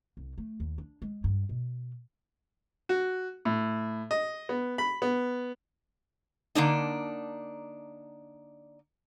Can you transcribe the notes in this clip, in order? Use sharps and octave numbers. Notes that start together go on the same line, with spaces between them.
C2
A3
D#2
D4
G#3
G2
B2
F#4
A2
D#5
B3
B5
B3
D3 A#3 D4 D#4